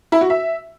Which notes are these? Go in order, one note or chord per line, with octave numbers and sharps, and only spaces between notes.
E4
F#4
E5